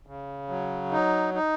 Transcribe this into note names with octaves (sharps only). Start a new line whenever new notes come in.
C#3
F#3
D#4
D#4